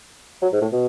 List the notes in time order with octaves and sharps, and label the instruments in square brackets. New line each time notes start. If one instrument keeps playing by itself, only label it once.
[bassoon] F#3
G#2
A2
B2